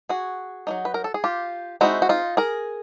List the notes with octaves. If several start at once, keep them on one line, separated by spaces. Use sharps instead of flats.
F#4 G#4
F#3 A#3 D#4
B4
A#4
A4
G#4
F4 G4
G#3 C4 D#4 E4 F#4
F#4
D#4 F4
G#4 A#4